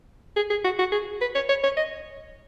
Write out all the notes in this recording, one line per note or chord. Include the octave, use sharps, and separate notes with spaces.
G#4
G#4
F#4
F#4
G#4
B4
C#5
C#5
C#5
D#5